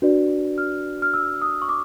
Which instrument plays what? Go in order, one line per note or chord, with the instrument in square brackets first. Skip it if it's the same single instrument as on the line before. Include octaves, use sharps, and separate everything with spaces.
[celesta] D4 F#4 B4 D5
F6
F6
E6
D#6
C#6
D6